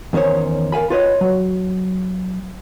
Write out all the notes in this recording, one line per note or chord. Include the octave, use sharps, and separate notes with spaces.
E2 D#3 C#4 C5 C#5
A#4 F5 G#5 B5
F4 B4 C#5 D#5
F#3